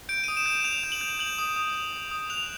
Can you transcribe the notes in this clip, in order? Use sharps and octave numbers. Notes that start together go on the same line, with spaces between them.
G6 D7
D#6 D#7
E7
G6
E7
G6 F7
G6
F#7
G6
G6 F#7
D#6
D#6
D#6
D#6
D#6
F#6 F7